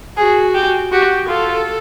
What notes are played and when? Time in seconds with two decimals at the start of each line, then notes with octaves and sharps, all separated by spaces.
0.17 F#4 G#4
0.55 G4
0.92 F#4 G4
1.29 F4 A4